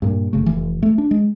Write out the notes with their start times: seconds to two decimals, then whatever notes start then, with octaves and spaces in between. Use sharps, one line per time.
0.02 G2 A#2
0.33 F#1 C#3 A3
0.46 F1 E3
0.83 A3
0.98 D4
1.11 G#3